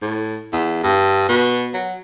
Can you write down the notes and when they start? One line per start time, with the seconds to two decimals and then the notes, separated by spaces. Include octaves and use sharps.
0.02 A2
0.52 E2
0.83 G2
1.29 B2
1.74 F#3